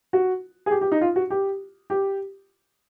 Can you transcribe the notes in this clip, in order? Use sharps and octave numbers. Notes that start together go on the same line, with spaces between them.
F#4
G#4
G4
G4
D#4
F4
F#4
G4
G4